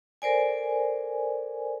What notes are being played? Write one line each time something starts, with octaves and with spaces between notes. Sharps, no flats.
A4 A#4 C5 D5 G#5